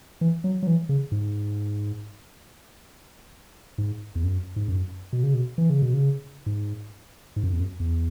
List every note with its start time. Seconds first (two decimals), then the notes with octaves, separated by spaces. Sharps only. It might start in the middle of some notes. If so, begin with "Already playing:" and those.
0.21 E3
0.44 F#3
0.63 F#3
0.67 E3
0.89 C#3
1.12 G#2
3.78 G#2
4.15 E2
4.24 F#2
4.56 G#2
4.68 F#2
5.13 B2
5.23 C#3
5.34 B2
5.58 E3
5.70 C#3
5.82 B2
5.94 C#3
6.46 G#2
7.36 G#2
7.43 F#2
7.53 E2
7.60 F#2
7.80 E2